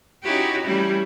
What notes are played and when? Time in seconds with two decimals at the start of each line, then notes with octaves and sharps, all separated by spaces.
0.22 C#4 D#4 E4 F#4 G4
0.64 E3 G3 A3 C#4 E4